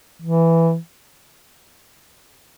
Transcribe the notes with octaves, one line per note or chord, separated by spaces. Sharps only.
E3